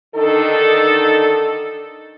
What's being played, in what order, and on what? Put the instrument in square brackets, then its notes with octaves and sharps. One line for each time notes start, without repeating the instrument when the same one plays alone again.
[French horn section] D3 D#3 D4 D#4 A4